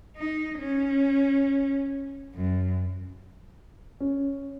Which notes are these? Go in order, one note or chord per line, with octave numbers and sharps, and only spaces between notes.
D#4
C#4
F#2
C#4